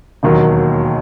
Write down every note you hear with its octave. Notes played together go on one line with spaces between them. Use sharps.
E1 D#2 D#3 F#3